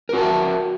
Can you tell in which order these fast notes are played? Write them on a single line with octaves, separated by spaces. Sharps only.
A#4 F#4 A5 E5